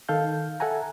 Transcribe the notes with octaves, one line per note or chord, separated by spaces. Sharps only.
D#3 A4 F5 G6
A4 E5 F#5 G#5 A#5